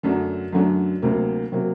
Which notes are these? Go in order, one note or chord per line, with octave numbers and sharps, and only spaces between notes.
F#2 D3 F#3 A3 D4
F#2 D3 F#3 A3 D4
D2 C3 F#3 A#3
C3 F#3 A#3